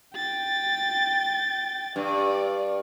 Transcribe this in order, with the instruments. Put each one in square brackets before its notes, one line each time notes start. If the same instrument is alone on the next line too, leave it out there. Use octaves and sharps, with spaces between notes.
[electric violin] G5 A6
[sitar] G2 [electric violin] D5